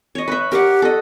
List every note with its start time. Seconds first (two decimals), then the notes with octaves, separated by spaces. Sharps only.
0.15 C#5 D#5
0.28 B4 E5
0.52 G4 A#4 F#5
0.82 A4 D#5